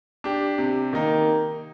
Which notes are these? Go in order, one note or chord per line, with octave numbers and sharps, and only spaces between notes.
D4 G4
C3
D#3 A#3 D#4